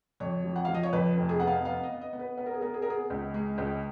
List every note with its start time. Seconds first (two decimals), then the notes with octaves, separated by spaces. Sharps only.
0.20 F2 C#5
0.44 F3
0.56 F#5
0.65 F3 F5
0.74 D#5
0.83 C#5
0.93 F2 B4
1.17 F1
1.29 G#4
1.40 B3 F#5
1.47 F5
1.65 B3 F5
1.83 D#5
1.89 B3
2.01 D#5
2.13 B3
2.19 B4
2.37 B3 B4
2.46 A#4
2.54 G#4
2.61 B3 A#4
2.74 G#4
2.82 A#4
2.86 B3 G#4
3.10 C#2
3.34 G#3
3.58 C#2